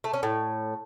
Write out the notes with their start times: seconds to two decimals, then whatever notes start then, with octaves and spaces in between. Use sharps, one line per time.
0.04 A3
0.13 C#4
0.23 A2